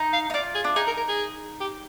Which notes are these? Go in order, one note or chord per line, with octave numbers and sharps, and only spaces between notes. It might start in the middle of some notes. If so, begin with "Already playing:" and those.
Already playing: D#4
F5
D#4
F4 D5
G#4
D4
D#4 G#4
A#4
A#4
G#4
G4